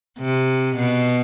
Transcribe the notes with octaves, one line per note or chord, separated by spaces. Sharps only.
C3
B2